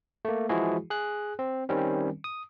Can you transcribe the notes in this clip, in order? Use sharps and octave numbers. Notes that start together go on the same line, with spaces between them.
A3 A#3
E3 F3 G#3 E4 F#4 G#4
G#4 F#6
C4
D#3 G3 C4 C#4
D#6